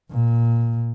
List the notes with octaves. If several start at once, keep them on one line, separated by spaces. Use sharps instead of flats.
A#2